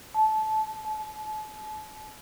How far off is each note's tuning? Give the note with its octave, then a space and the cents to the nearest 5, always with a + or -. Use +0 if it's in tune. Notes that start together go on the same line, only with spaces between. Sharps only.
A5 -20
A5 -40